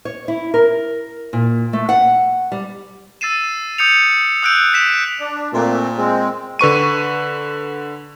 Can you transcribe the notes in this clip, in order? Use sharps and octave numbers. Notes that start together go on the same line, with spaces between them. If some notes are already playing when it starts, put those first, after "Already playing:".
C#5
E4
A#4
A#2
A3
F#5
G3
E6 A6 C7 D#7 E7
D#6 G6 C#7 F7
D#6 E6 F#6 G6 D7
B6 E7
D4
A#2 A3 C4
G#3 C4
D3 B4 C#6 D#7